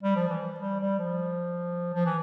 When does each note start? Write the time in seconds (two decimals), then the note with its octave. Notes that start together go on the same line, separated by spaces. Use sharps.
0.03 G3
0.16 F3
0.29 E3
0.60 G3
0.80 G3
0.99 F3
1.94 F3
2.05 E3